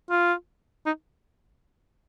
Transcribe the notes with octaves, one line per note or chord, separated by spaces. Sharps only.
F4
D#4